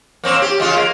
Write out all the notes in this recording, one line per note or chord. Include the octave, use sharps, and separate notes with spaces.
A#3 C4 C#4
G4
C#3 G#3 F4
A#3